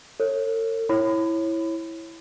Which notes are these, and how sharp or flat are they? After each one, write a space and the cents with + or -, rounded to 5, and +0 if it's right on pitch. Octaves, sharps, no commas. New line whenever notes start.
A4 +45 C#5 -20
E4 +0 C#5 -20 B5 +30